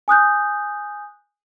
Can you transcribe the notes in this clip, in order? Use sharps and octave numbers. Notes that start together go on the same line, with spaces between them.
G#5 D#6 F#6 G6